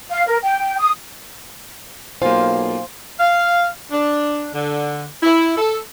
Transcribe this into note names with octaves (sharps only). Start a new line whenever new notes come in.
F5
A#4
G5
D#6
B1 A#3 F4 C5 F5 G#5
F5
D4
D3
E4
A4